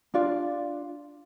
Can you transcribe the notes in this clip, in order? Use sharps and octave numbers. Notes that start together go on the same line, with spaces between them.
D4 F4 D5